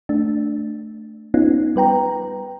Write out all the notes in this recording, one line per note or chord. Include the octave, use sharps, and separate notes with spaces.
A3 D4
B3 C#4 D#4 F4
G3 B4 G5 A#5